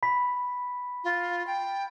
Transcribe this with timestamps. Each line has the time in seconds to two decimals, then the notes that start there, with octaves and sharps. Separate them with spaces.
0.03 B5 B6
1.04 F4
1.47 G5